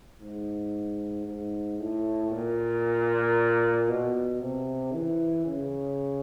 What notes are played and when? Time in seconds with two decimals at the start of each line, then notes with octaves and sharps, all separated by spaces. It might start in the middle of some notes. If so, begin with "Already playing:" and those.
0.21 G#2
1.26 G#2
1.79 A2
2.31 A#2
3.89 B2
4.41 C3
4.93 E3
5.46 C#3